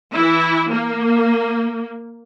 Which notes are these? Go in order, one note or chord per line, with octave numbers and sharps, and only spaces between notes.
E3 E4
A#3